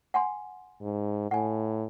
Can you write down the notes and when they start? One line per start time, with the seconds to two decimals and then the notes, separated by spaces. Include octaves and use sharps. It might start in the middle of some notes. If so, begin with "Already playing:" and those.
0.14 F#5 G#5 C6
0.82 G#2
1.31 A2 F#5 G#5